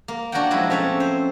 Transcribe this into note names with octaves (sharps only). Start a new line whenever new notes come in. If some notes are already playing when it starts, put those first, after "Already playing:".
A#3
D4 F#4 A#4 C#5 F#5 G5
F3 F#3 G#3 E4
A3 C4 C#4 A4 F5
C5